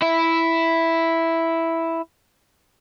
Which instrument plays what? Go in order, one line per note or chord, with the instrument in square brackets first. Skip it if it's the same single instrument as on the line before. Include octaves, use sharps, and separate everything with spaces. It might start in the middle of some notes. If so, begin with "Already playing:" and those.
[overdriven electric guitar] E4 E5